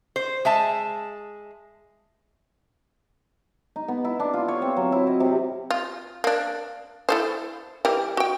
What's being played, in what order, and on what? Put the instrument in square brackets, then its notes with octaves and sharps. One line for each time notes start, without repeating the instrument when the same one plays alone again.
[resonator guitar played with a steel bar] C5
G#3 E5 A5
[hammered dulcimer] D#4
B3
E4
D4
F4
C#5
C4
F#3
E4
D#5
C3
[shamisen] F4
A#3 D4
E4 A4 C5
E3 G3 A#4
F#4 G5